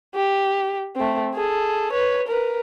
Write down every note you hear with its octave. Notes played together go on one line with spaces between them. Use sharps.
G4
A3 C4
G#4 A4
B4 C#5
A#4 B4